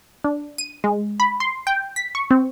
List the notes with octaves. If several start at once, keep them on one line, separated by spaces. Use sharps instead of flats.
D4
D#7
G#3
B5
C6
G5
B6
C#6
C4